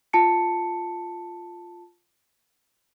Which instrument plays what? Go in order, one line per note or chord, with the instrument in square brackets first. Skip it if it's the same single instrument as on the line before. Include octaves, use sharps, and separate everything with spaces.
[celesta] F4 A5 C#7